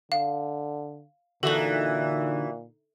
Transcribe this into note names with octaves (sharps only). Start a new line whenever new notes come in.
D3 F5
A#2 D3 E3 D#4 F#4 A4 F#7